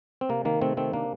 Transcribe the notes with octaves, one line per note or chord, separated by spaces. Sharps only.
C4
C3 A#3
D#3 A#3
C3 A3 C4
D#3 A3 C4
C3 A#3 D4